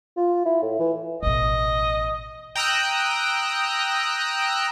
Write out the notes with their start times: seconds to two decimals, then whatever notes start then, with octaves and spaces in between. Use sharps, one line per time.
0.17 F4
0.45 E4
0.62 A2
0.79 E3
1.23 A1 B2 D#5
2.55 G5 A#5 D#6 E6 F#6